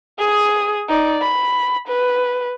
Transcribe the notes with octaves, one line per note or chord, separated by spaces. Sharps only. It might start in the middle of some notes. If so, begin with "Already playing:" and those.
G#4 D#6
D#4 D5
B5
B4